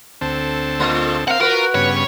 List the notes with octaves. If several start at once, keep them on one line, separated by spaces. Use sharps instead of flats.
D2 C4 A4
A3 F4 D#5
C4 A#4 F5 F#5
F4 F#4 A#4 B4
G2 C#3 B3 C#5